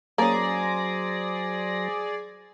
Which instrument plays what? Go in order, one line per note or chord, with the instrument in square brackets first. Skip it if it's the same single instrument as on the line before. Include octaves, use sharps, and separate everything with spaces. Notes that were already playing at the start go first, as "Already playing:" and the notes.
[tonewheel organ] F#3 C5 A#6 [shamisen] A#3 C#4 [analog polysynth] G#4 D5 [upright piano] A#5